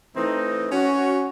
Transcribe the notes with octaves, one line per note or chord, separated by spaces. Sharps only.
E3 A3 C4 D#4
C#4 F#4